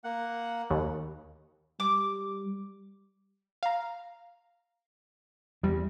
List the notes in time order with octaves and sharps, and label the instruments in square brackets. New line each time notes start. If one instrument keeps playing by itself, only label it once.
[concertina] A#3 F#5
[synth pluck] D#2
[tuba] G3 [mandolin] D6
[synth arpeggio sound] F5 A#5
[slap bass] E2 [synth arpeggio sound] C3 G3